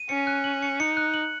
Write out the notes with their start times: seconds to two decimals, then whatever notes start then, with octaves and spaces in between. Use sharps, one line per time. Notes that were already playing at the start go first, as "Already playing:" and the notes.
Already playing: D#7
0.09 C#4 C#7
0.27 F#6
0.44 F#7
0.63 C#7
0.80 D#4 C#7
0.97 F#6
1.14 F#7